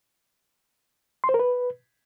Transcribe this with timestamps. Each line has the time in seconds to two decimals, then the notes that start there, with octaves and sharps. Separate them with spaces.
1.24 C6
1.29 C5
1.34 A#4
1.39 B4